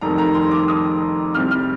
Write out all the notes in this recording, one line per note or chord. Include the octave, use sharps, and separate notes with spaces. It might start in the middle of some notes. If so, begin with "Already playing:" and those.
F1 F2 D#3 G3 A#5
A#5
C6
D6
D#6
C2 C3 G3 F6
F6